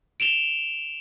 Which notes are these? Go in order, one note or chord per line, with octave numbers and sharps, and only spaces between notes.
D7 E7 F7 G7